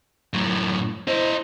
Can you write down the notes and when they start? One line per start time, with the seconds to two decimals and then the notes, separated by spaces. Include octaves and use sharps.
0.33 F#2 A2
1.08 E4 C5 D#5